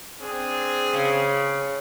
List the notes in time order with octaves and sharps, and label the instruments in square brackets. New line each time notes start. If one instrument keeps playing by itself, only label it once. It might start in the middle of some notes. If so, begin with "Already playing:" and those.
[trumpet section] C4 D4 G#4
[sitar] C#3